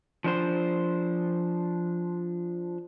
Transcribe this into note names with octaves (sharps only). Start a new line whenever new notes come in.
F3 D4 C5